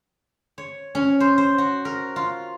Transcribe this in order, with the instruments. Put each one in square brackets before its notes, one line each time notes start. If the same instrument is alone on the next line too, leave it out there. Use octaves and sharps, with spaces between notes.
[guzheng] C#5
C#4
C5
C5
F#4
A#4
F4